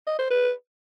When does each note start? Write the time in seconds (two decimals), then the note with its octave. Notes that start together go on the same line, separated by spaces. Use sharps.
0.07 D#5
0.19 C5
0.30 B4